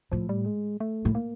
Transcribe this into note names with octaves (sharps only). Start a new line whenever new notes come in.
A2 F3
G3
G#3
A3
A2
A#3